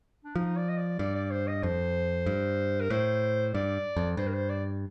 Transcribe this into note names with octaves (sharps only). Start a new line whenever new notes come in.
D4
F3 D#4
D5
D#5
D5
G2 D5
D5
C5
D#5
F2 C5
G2
A#4
A2 C5
G2 D5
F2
G2 C5
A#4
C5
D5